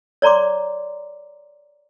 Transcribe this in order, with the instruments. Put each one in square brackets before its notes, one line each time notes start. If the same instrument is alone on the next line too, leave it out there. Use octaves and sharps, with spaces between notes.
[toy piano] C#5 D5 A#5 C6 D6